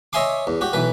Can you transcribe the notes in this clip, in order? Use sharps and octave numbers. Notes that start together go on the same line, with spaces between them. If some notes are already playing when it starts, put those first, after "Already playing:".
C#5 D#5 E5 G#5 C6 D6
E2
F#4 G4
B1 E3 B4